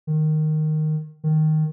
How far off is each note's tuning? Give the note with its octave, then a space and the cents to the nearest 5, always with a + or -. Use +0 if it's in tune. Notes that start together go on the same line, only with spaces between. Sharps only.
D#3 -10
D#3 +0